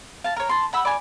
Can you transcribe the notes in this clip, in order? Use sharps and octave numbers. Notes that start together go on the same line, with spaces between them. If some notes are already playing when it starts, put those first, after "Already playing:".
F5 A5
A#4 C#5
A5 C6
F#5 B5 E6
D5 G#5